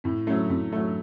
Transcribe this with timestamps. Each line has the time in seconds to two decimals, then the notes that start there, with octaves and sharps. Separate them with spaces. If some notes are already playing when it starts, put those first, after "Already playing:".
0.04 A2 C4
0.27 F#3 A3 C#4
0.50 A2 C4
0.73 F#3 A3